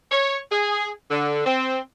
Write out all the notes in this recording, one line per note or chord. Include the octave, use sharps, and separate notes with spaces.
C#5
G#4
D3
C4